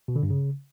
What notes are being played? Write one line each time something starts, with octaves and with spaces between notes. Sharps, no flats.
B2
D3
G2
C#3